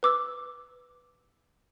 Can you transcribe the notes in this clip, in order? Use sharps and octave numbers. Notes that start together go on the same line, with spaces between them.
B4 D6 E6